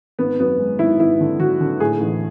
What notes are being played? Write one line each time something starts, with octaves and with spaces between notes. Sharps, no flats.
G#1 B3
F#2 B3
G#3
G#1 E4
G#1 E4
D3
D3 F#4
D3
A2 G#4
A1